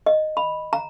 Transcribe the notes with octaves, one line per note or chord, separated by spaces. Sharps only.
D#5
B5
A#5